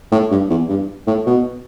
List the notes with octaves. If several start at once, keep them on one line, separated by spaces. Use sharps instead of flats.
A2
G2
E2
G2
A2
B2